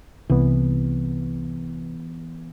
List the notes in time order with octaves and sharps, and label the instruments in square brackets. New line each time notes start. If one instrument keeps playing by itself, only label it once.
[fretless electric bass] C2 [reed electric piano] E3 B3